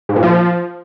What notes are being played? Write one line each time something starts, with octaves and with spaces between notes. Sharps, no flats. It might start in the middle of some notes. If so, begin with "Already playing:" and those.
G#2
A#2
F3